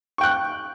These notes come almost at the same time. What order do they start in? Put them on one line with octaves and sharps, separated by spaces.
C#6 G5 F#6